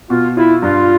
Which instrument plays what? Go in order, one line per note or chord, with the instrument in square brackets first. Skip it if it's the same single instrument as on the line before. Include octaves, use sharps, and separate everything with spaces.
[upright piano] B2 [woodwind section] F4
[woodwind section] E4 [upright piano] F4
[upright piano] G2 [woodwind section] F4